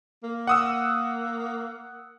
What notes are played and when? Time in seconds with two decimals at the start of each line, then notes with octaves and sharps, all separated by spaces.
0.24 A#3
0.47 F#5 D#6 E6